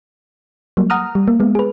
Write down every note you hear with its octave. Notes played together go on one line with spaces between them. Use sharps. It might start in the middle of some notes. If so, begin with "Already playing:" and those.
F#3 G3 A#3
F#5 A#5 D#6 F6
G3
A#3
G#3 B3
G#4 B4